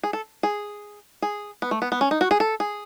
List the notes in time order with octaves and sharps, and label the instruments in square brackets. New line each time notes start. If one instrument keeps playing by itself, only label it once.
[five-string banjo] G#4
A4
G#4
G#4
B3
A3
B3
B3
C#4
D#4
F#4
G#4
A4
G#4